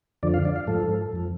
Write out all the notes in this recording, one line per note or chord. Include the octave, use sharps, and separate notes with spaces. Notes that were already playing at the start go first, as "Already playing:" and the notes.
F2 D3 F3 D5
F5
D5
F5
G#2 F3 A4
F2 F3